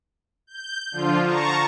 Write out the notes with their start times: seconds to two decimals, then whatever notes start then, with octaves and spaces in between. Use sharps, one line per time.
0.47 G6
0.91 D3 F3 F4
1.24 A5 A#5 C#6